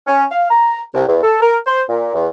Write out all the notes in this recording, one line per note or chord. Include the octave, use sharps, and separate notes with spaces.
C#4
F5
A#5
C2
E2
A4
A#4
C5
A#2
E2